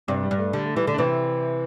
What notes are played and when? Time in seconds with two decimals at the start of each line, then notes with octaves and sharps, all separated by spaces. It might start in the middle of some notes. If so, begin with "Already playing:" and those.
0.08 G2 C3 C4
0.23 G3
0.31 G2
0.39 A3
0.53 D3 G3
0.65 A3
0.76 E3 G3
0.87 D3 A3
0.94 D4
0.98 C3 E3 C4